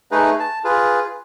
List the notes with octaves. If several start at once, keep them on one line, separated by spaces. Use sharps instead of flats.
A3 D#4 G#4 B4
A5
F4 G#4 B4